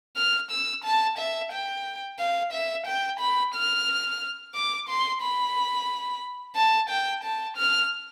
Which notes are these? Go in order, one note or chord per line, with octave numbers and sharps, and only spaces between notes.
F6
E6
A5
E5
G5
F5
E5
G5
B5
F6
D6
C6
B5
A5
G5
A5
F6